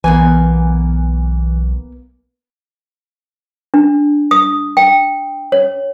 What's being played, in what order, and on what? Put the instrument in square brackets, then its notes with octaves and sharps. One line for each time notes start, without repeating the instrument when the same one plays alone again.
[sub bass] B1 [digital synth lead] E3 [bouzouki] A#3 B3 G#5
[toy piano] D4
D#6
G5
C#5